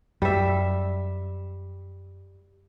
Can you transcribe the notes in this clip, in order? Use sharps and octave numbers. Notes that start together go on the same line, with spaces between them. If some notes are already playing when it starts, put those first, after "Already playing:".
F#2 G3 E5